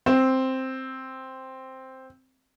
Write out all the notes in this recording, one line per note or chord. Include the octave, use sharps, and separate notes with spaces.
C4